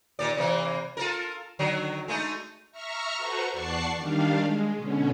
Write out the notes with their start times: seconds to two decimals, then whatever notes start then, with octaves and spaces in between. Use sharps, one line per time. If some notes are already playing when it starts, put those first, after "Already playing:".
0.19 D#2 A#2 D5
0.37 C3 E3 A#3
0.97 F4 A4 A#4
1.59 D3 D#3 F#3
2.08 G#3 A3 D#4
2.72 E5 A#5 C#6 F6
3.17 F#4 A4 B4 C5 A#5 C#6
3.52 E2 D5 F#5 A5 C#6 C7
3.96 D#3 G3 D4 F5
4.38 G#3
4.76 B2 D3 C#4